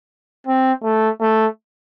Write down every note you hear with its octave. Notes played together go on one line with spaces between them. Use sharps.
C4
A3
A3